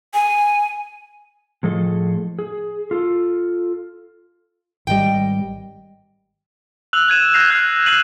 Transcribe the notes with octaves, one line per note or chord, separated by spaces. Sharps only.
G#5
A2 F3 G#4 A4 D#5
G#4
F4 A4
G#1 G3 D#5 G5
E6 F#6 F7 F#7
F#6 G#6 D#7 E7
F6 G6 A#6 C7 D#7 F7
F#6 G#6 C7
E6 F#6 C7 D#7 F#7